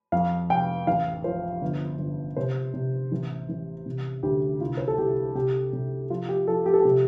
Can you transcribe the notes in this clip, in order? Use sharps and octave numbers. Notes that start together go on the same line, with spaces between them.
F2 F5
F1 G5
A1 F5
F3 C5
G1
G1
C3 C5
C3
A1
A1
C3
D2 G4
C2 F4
C5
A4
C2 G4
C3 G4
C3
F3 F4
G4
F3 A4
G4
A4
C3 G4